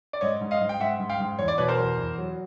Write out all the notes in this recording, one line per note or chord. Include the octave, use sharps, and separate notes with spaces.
D5
G#2 C#5 D#5
G#2
D#5 F5
G#2
G5
G#2 E5 F#5
G#2
F5 G5
G#2
E2 C#5
D5
B2 B4 C#5
A#4 C5
E2
E2
F#3